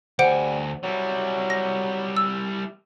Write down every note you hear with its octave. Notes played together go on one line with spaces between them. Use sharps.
D2 G3 C5 F#5 G#5 D7
F#3 G3 E4
A#6
E6